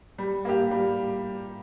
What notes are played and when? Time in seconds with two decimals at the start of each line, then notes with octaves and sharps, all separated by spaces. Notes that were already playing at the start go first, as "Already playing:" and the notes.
0.18 G3
0.45 A#3 G4
0.71 G3